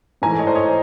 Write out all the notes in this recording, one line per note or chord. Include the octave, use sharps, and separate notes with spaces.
G#2 E3 A3 G#5 A#5
C#5 D#5
C5 D5
C#5 D#5